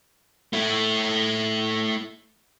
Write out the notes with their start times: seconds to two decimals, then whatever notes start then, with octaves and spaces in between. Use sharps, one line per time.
0.53 A3 E4